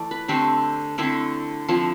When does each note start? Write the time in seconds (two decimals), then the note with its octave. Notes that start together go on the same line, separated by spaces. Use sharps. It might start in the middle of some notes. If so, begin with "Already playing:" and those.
Already playing: E3 A3 D5
0.11 B4
0.28 D3 A3 C4 G4
0.98 D3 A3 C4 E4
1.68 D3 F3 C4 E4